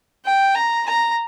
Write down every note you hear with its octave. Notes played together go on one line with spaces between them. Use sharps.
G5
A#5
A#5